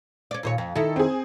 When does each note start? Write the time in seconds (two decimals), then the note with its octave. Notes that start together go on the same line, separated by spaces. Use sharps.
0.31 C#4 D5
0.43 D#2 A#2 C#5
0.58 F2
0.76 D#3 E4 A4
0.96 C4 G#4